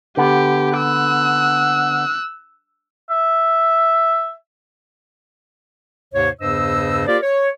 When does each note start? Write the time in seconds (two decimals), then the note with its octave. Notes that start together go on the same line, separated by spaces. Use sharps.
0.17 D3 B3 G4
0.78 E6 F#6
3.10 E5
6.14 D#2 G#2 C3 C5 C#5
6.40 E2 G2 C#3 C5 D#5 E6
7.07 A#3 F4 G4 A#4 C5 D5
7.23 C#5